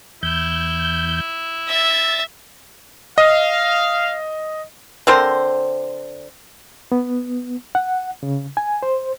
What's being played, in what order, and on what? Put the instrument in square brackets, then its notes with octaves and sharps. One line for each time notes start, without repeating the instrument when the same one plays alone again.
[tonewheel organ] E2 G6 [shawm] E4
[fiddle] E5 [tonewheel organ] A6
[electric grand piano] D#5 [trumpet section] F5
[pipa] D3 C4 A#4 C5
[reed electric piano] B3
F#5
C#3
G#5
C5